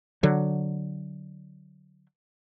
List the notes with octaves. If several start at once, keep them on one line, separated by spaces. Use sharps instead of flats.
D3 F#3